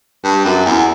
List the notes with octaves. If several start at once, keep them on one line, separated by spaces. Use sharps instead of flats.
G2
F#2
E2